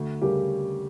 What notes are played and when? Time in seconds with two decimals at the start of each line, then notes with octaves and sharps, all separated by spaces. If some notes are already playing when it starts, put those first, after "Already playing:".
Already playing: D2
0.21 C#3 G3 G4 A#4